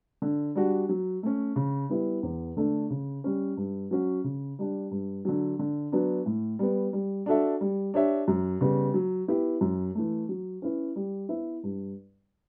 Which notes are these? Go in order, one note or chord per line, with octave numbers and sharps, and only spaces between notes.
D3
G3 D4 F#4
F#3
A3 C#4
C#3
G3 B3 E4
E2
D3 A3 D4 A4
C#3
G3 C#4
G2
F#3 C#4 F#4
C#3
G3 D4
G2
D3 F#3
D3
F#3 B3 D4
A2
G3 B3
G3
D4 F#4 A4 E5
G3
D4 G4 C#5 E5
F#2
C#3 G3 B3
F#3
B3 E4 G4
F#2
E3 A3
F#3
C#4 E4 B4
G3
B3 E4 B4 E5
G2